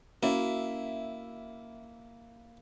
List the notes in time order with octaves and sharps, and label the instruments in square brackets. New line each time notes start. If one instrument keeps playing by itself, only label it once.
[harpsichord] A#3 E4 [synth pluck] C#4 F#4 [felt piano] E5